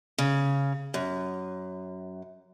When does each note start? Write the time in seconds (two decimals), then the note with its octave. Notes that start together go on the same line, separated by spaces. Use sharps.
0.18 C#3
0.94 F#2